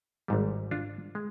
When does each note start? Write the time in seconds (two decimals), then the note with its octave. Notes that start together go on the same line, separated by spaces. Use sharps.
0.28 G#1 G#2 G3
0.71 D4 F4
1.15 G#3